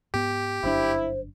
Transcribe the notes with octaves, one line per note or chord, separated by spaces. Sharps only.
G#2 B3 G4
G1 F#2 D4 E4 C5